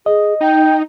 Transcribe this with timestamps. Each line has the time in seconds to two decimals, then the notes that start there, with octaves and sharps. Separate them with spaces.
0.06 G#4 D#5
0.41 D#4 G5